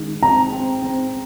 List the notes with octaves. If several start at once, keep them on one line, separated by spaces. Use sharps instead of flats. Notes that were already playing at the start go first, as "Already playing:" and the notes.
Already playing: D#3 G#3
C4 A#5
C4
C4